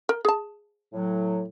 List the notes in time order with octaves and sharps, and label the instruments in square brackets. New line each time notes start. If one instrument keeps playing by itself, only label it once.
[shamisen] A#4
G#4 A5
[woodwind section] A2 F#3